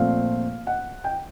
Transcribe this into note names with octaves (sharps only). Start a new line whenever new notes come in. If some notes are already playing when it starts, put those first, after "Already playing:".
Already playing: A#2 F3 A3 C4 F5
F#5
G5